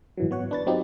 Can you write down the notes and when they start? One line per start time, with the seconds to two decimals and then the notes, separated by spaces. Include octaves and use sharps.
0.17 G#1 E3 F#3
0.31 B3 C#5 F#5
0.51 D4 B4 A6
0.67 F#3 C4 D#4 F4 G4